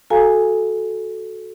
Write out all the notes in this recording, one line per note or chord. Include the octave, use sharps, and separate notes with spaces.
F#4 A4 F5 G#5 A#5